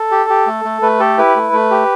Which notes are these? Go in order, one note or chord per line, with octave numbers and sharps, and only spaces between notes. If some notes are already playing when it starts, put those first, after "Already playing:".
Already playing: A4
G4
G4
A3
A3
A3 B4
G4 A4
E4 B4
A3
A3
G4